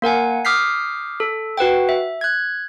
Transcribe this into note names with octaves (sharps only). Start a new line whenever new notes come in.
A#3 A#4 F#5 G#5
D6 D#6 F6 G6 B6 C7
A4
F#4 B4 F#5 G5
E5
F#6 G#6